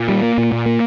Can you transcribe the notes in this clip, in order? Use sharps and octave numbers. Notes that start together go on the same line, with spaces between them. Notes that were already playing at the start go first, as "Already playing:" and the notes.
Already playing: A#2
G3
A#3
A#2
A#2
A#3